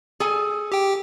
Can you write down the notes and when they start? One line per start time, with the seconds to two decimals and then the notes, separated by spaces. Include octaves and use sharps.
0.20 G#4 A4 G#5
0.72 G4 G5